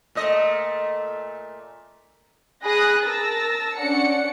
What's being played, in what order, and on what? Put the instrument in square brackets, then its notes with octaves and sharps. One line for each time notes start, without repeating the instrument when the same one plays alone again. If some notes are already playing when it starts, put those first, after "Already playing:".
[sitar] A#2 A3 D#5
[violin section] G#4 B5 D#6 F#6 A#6
A#4 A5 E6 A6 A#6
C#4 D4 D5 F#5 C#7